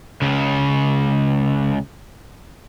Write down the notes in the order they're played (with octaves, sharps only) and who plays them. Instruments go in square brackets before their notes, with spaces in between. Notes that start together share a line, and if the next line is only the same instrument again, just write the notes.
[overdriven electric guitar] C#2 C#3